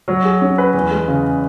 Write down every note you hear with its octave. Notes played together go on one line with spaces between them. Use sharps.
F#3
G#4
C#4
B4
E2
G#3
C#3